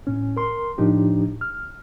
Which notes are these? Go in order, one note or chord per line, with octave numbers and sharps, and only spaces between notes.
A2 C#4
A#4 C6
A2 F3 D4 D#4 G4
F6